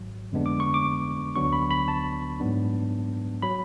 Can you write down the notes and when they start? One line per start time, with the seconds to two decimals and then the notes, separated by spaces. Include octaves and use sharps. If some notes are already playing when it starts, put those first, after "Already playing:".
Already playing: G#1 G#2 F#3
0.32 F2 D3 G#3 B3 D4
0.46 D6
0.60 C#6
0.74 D6
1.36 D2 D3 F#3 B3 D4 C#6
1.53 B5
1.71 B5
1.88 A5
2.40 G#2 F#3 B3 D4
3.42 F#3 B5